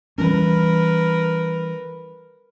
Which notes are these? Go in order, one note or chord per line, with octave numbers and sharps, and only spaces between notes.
E3 G3 C#4 A#4 B4